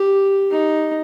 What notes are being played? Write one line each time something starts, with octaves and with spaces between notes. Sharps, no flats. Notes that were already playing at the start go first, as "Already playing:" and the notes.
Already playing: G4
D#4